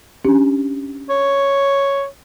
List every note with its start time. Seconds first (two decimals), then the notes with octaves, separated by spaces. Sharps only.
0.25 C#4 D4 G4
1.10 C#5